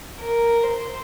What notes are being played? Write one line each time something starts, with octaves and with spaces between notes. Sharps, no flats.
A#4
C5